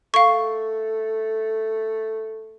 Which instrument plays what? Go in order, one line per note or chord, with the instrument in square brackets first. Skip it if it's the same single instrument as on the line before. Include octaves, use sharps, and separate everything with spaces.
[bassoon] A3 [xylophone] F5 C#6